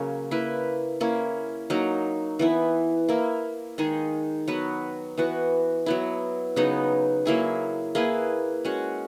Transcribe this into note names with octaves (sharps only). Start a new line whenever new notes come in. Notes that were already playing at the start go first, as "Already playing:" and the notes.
Already playing: C#3 F#3 A#3 C#4
A#3 E4 B4
A#3 C#4 E4
F#3 A#3 D#4
E3 B3 E4
A#3 E4 A#4
D#3 G#3 D#4 G#4
F#3 B3 F#4 B4
E3 B3 F#4
F#3 B3 E4
C#3 F#3 B3 D#4
F#3 A#3 E4 G#4
A#3 E4 G#4 B4
G#3 C#4 F#4